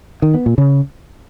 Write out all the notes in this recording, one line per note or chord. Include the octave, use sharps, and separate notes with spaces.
D#3
B3
A#2
C#3